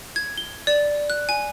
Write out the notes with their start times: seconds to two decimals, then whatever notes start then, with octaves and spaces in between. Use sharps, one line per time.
0.16 G#6
0.37 G7
0.67 D5
1.10 F#6
1.29 G#5